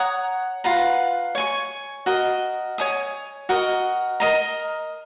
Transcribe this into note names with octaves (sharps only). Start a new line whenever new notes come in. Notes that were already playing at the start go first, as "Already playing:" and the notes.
Already playing: C#5 F#5 A#5 D#6
F4 B4 F#5 A#5
C#5 G#5 C#6
F#4 A#4 D#5
C#5 G#5 D#6
F#4 A#4 D#5
A#4 D#5 A#5